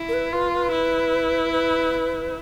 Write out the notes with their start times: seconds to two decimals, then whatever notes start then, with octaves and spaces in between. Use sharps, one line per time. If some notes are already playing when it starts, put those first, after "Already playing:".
Already playing: E4
0.09 A#4
0.13 B4
0.33 F4 B4
0.53 B4
0.72 E4
1.52 B4